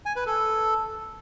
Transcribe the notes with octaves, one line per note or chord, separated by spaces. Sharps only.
G#5
B4
A4